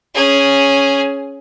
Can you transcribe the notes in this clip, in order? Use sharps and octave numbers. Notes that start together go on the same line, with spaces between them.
C#4 G#4